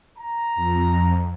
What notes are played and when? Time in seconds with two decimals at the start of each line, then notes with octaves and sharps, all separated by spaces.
0.18 A#5
0.56 F2